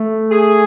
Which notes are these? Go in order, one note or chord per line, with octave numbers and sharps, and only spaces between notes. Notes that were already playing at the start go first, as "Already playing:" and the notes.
Already playing: A3
G#4